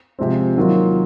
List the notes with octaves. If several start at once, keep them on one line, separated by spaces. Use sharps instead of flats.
C3 F3 G#3 C4
D#3 F#3 A#3 F4